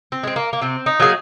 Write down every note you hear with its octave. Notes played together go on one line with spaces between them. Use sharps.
C4
G#3 C4
A#3
A#3
C3 C4
D#4
F#3 A#3 G#4